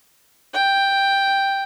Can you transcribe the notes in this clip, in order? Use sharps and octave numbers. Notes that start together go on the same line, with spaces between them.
G5